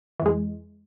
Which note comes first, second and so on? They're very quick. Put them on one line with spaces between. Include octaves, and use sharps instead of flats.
E3 F2 G#3